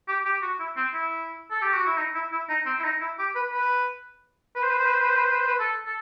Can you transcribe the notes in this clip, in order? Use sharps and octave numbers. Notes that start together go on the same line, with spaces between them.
G4
G4
F#4
E4
C4
E4
A4
G4
F#4
E4
D#4
E4
E4
D#4
C4
E4
D#4
E4
G4
B4
B4
B4
C5
B4
C5
B4
C5
B4
C5
B4
C5
B4
C5
B4
A4
A4